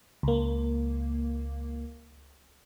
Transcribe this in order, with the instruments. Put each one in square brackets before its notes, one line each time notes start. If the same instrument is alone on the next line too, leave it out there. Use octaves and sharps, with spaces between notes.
[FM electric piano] C#2 A#3